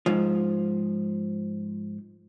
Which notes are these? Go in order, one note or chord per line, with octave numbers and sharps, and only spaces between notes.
G#2 F3